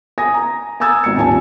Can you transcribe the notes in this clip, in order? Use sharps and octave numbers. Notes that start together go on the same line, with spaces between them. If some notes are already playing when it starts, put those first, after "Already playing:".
G#5 D#6 A#6
A#5
G#5 A#5 D#6 E6 G#6 A6
G#1 C#7
D#1 G#5 A5